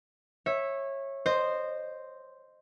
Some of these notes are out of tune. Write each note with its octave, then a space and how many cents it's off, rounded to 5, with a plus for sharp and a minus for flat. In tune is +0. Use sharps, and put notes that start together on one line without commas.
C#5 -20 E5 +0
C5 +0 D#5 -20